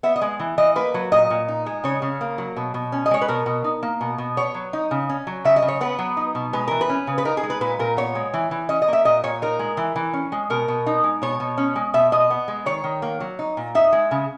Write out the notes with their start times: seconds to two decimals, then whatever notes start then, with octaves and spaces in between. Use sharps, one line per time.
0.03 B3 E5
0.16 D#5
0.21 G#3
0.40 E3
0.58 E3 D#5
0.76 A#3 B4
0.94 F#3
1.12 A#2 D#5
1.30 A#2
1.48 D#4
1.66 G#3
1.84 C#3 C#5
2.02 C#3
2.21 A#3
2.38 F#3
2.57 B2
2.74 B2
2.92 C#4
3.06 D#5
3.11 G#3 C#5
3.21 B4
3.28 B2 A#4
3.46 B2
3.64 D#4
3.83 A#3
4.01 B2
4.18 B2
4.37 B3 C#5
4.55 F#3
4.73 D#4
4.91 C#3
5.09 C#4
5.27 F#3
5.45 C#3 E5
5.56 D#5
5.62 C#3
5.68 C#5
5.81 B3 B4
5.99 F#3
6.17 D#4
6.35 B2
6.53 G#3 B4
6.68 E3 A#4
6.81 B4
6.89 C#4
7.07 C#3
7.18 B4
7.25 D#4 A#4
7.37 G#4
7.43 G#3
7.50 B4
7.61 A#2 B4
7.79 A#2 A#4
7.97 B3 C#5
8.15 G#3
8.34 E3
8.51 E3
8.69 C#4 D#5
8.82 D#5
8.88 A#3 E5
9.05 A#2 D#5
9.24 A#2 C#5
9.42 D#4 A#4
9.59 G#3
9.77 E3
9.96 E3
10.13 C#4
10.32 G#3
10.50 B2 A#4
10.68 B2
10.86 D#4
11.04 G#3
11.22 B2 C#5
11.40 B2
11.58 C#4
11.76 G#3
11.94 B2 E5
12.12 B2 D#5
12.30 B3
12.48 G#3
12.66 D#3 C#5
12.84 D#3
13.02 A#3
13.20 F#3
13.39 D#4
13.57 A#2
13.75 D#4 E5
13.93 G#3
14.11 C#3